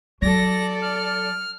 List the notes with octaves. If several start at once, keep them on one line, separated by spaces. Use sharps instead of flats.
F#3 A4 D5 A#6
F6